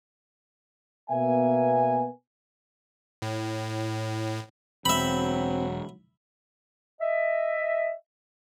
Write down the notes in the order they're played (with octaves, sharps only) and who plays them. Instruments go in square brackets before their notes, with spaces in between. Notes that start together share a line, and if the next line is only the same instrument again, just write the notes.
[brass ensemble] B2 A#3 B3 E5 G#5
[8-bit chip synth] A2
[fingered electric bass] E1 [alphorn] F#3 [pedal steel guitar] C4 [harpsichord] E5 B5
[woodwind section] D#5 E5